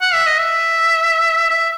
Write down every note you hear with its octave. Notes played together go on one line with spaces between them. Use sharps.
F#5
E5
D#5
E5
E5